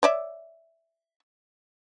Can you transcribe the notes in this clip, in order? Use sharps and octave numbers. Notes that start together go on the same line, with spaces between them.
C#5 D5 E5